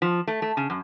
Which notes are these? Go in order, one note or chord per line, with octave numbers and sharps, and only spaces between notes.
F3
A3
A3
C#3
F#2